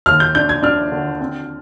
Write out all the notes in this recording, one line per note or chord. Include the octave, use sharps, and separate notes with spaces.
D#2 F6
G6
D4 G6
G#6
D4 F6
D3
C4